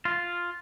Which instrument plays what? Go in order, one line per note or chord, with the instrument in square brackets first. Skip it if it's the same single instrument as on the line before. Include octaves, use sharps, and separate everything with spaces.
[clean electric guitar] F4